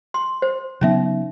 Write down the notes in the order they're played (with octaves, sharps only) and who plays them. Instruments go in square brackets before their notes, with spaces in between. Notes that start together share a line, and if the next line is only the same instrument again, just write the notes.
[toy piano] C6
C5
[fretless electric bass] C#3 F#3 B3 [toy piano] C#4 D#4 E5